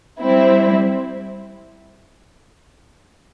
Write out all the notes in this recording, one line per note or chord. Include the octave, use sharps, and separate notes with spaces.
G3 C4 E4